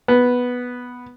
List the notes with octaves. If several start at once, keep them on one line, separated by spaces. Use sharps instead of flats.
B3